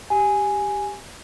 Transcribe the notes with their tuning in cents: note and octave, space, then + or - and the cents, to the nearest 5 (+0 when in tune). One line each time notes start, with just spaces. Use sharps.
G4 +0 G#5 +0